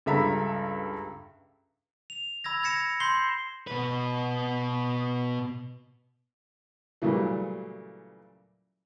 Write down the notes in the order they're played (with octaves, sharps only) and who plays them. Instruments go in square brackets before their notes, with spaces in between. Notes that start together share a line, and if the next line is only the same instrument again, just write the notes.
[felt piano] C#2 G2 A4 E5 A#5 B5
[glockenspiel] F7
B5 E6 G#6 A#6
G#6 A#6 C#7 E7
C6 G6 C7 G7
[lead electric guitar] B2 B4
[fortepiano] A#2 C#3 E3 F#3 G3 A3